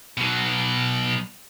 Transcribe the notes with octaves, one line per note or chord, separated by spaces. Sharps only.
B2 F#3